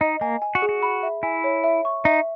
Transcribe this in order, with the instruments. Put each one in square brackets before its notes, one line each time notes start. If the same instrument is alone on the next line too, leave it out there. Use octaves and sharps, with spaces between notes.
[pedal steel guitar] D#4 [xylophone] D#5
[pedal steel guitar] A#3 [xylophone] G#5
[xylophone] G#5
[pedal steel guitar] F#4
[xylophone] G#4
[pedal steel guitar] F#4
[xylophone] B5
E5
[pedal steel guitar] E4 [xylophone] G#5
[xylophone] C#5
E5
C#6
[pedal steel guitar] D#4 [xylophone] E5